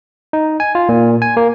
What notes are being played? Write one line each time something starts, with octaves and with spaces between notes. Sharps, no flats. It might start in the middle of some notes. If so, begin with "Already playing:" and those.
D#4
G#5
F4
A#2
G#5
A#3